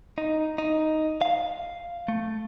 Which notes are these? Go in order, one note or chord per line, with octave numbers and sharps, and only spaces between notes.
D#4
D#4
F5
A3